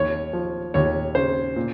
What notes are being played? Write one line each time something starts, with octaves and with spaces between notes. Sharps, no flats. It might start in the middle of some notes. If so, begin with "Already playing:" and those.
Already playing: D#2 C#5
F3
D#2 C#5
C#3 C5
A#2